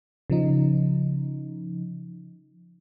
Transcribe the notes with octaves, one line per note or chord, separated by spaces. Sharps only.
C#3 F3 D#4